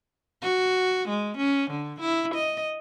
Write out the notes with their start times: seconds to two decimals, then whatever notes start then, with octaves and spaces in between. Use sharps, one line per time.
0.42 F#4
1.08 G#3
1.37 C#4
1.71 D3
2.00 E4
2.34 D#5